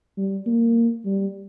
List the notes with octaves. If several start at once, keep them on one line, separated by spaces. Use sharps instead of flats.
G3
A#3
G3